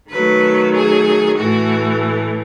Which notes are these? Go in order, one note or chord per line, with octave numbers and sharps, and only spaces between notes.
D#3 F#3 A3 B4
G#4
A2 E3 A3 F#4